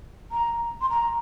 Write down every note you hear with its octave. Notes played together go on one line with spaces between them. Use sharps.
A#5
C6
A#5